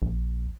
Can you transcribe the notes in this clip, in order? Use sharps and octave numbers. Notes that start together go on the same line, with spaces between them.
A#1